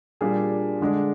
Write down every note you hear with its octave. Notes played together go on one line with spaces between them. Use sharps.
A#2 G3 D4 G#4
D3 G#3 D4 G#4